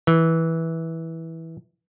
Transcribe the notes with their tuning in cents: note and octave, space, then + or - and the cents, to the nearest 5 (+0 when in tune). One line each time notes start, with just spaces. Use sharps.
E3 -15